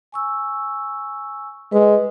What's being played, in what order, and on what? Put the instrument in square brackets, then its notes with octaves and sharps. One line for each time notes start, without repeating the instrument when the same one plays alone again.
[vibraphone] G#5 C#6 E6
[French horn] G#3 [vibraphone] B4